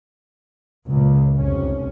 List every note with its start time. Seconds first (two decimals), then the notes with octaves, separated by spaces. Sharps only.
0.87 C#2 A#2 C#3
1.36 F1 C2 C#4